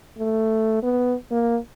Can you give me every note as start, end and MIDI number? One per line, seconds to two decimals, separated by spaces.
0.19 0.81 57
0.83 1.14 59
1.31 1.57 58